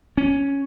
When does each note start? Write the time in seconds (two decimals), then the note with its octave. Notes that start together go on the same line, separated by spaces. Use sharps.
0.17 C#4